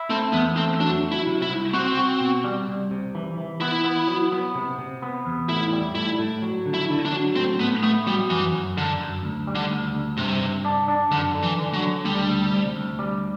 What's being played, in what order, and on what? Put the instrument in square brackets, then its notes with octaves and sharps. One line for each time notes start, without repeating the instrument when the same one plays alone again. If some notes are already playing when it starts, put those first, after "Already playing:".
Already playing: [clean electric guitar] E4
[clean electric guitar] A3 [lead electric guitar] C4
[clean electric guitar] E2 [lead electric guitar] B3
[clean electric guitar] A3 [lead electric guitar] C4
[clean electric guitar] F#3 [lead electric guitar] D4
[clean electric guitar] F#3
[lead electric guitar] E4
[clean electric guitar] C3
[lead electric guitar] E4
[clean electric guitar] C2
[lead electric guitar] C4 [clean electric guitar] F#4
[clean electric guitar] F#4
B2
G3
C2
C3
E3
E3
[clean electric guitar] B3 [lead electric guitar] E4
[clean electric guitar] B3
F#3
B3
C3
C3
B3
E2
[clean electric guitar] A2 [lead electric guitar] E4
[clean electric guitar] G3
[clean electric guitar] A2 [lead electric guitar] E4
[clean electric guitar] A2
F#3
D3
[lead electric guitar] E4
[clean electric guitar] D3
[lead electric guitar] D4
[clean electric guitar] F#3
[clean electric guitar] A2 [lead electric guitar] C4
[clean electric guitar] A2 [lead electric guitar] B3
[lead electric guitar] A3 [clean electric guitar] B3
[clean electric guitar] F#3 [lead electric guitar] G3
[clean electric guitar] F#2 [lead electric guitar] E3
[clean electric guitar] F#2
[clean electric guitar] F#2 [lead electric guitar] D3
[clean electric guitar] F#2
D2
G3
[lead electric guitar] D3
[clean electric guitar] D2
D2
[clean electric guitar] G2 [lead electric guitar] C3
[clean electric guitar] G2
D4
D4
[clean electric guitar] F#2 [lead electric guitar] D3
[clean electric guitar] D3
[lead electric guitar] E3
[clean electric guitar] D3
[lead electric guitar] F#3
[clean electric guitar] D3
[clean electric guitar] D2 [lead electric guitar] G3
[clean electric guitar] D2
C3
D2
G3